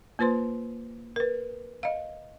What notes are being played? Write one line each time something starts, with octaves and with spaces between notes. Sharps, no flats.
A#3 F4 B4 C5 C6
A#4 B4
D#5 F5